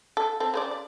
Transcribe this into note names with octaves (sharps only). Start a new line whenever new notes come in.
A4
C4 A4
C#3 C5 D5
D5